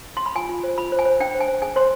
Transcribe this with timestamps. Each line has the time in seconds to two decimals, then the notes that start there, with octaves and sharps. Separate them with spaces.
0.17 C6
0.26 B5
0.35 F4 G#5
0.49 F4
0.63 C5
0.78 F4 B5
0.92 C5
0.99 G#5
1.05 C5
1.20 D4 G5
1.34 C5
1.40 G#5
1.48 C5
1.62 G#4 G#5
1.76 C5 C6